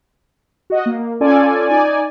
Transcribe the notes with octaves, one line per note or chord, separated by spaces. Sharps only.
F#4 D#5
A#3
C#4 F4 A4 D5 G#5
D#4 D5 G#5